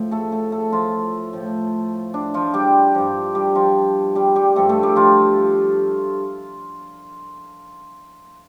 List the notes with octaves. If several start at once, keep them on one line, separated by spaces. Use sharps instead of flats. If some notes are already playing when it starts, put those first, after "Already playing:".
Already playing: A2 F3
A3 A4
A3 A4
A3 A4
F3 F4
A2 F3
D4
F3 F4
G3 G4
G2 F3
G3 G4
F3 F4
G3 G4
G3 G4
G2 F3 A3 A4
A3 A4
G3 G4
F3 F4